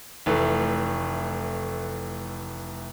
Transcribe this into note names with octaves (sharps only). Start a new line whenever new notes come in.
F1 E3 A3